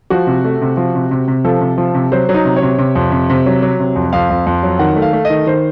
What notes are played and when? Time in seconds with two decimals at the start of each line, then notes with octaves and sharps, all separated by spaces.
0.10 F3 F#4
0.27 C3
0.45 A3
0.62 C3
0.77 F3
0.95 C3
1.11 C3
1.28 C3
1.44 F3 A4
1.61 C3
1.78 F3
1.94 C3
2.12 F#3 C5
2.29 F#3
2.34 D#4
2.45 C3
2.56 C#5
2.62 C3
2.78 C3
2.95 F2
3.12 C3
3.30 C3
3.46 F#3
3.62 F#3
3.80 C3
3.96 F2
4.13 F2 F5
4.30 F2
4.46 F2
4.63 F#3
4.79 D#3 F#5
4.96 A3
5.02 F5
5.13 A3
5.25 D#5
5.30 D#3
5.47 D#3 C5